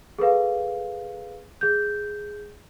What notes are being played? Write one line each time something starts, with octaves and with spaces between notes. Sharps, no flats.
G#4 A4 B4 F5
G#4 G6